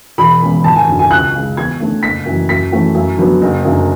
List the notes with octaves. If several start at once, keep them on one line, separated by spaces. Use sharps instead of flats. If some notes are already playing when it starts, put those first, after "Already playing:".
E1 B5
E2 C#3 G#3 C#4
G#1 A5
G#5
F#2 D3
G#5
C#2 F#6
C#3 G#3
E2 G#6
D3 A3 C#4
F#1 B6
F#2 E3
F#2 B6
E3 A3 C#4
F#2
D3 F#3 B3
F#1
F#2 D3